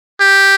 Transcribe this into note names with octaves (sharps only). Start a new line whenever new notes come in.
G4